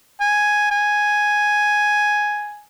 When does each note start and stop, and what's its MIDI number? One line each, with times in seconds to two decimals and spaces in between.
0.20 0.66 80
0.71 2.63 80